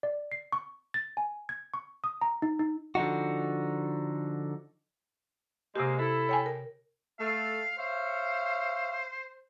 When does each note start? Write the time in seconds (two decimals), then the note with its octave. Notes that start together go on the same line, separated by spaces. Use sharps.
0.03 D5
0.32 C7
0.52 C#6
0.94 A6
1.17 G#5
1.49 G#6
1.74 C#6
2.04 D#6
2.21 A#5
2.42 D#4
2.59 D#4
2.95 D3 F3 D#4 F#4
5.76 C3 G#3 A#3 G4
5.99 E4 A4
6.29 C#5 G5 G#5
6.46 A#4
7.19 A3 F5
7.78 C5 C#5 E5 F5